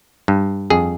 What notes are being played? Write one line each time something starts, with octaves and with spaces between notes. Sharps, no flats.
G2
F2 G#4